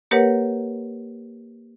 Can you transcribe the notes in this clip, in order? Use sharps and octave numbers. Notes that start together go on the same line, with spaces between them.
A#3 G4 A#4 B4 C#5 F#5